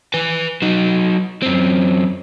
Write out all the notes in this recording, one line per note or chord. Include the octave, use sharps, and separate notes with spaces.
B4 G#5
F#3 D#4
F#2 C4